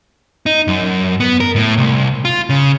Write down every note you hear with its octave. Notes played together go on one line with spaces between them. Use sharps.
D#4
F#2
B3
A#4
A2
C2
F4
C#3